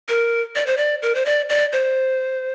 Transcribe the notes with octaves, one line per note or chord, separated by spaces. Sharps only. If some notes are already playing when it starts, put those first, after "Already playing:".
A#4
D5
C5
D5
A#4
C5
D5
D5
C5